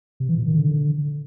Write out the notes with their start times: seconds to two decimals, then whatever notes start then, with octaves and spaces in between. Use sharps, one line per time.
0.20 C3
0.29 E3
0.38 A#2
0.46 D#3
0.55 D3